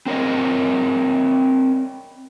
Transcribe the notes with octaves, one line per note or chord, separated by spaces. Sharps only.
C4 A#4 C#5 D#5